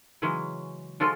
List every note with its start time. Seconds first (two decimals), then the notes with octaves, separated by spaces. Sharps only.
0.22 C#3 E3 F#3 G#3 C#4
1.00 F3 G#3 F4 F#4 A4